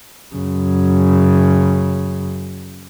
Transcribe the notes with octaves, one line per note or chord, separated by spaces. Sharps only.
F#2 C#3